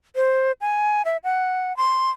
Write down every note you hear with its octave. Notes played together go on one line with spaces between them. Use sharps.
C5
G#5
E5
F#5
C6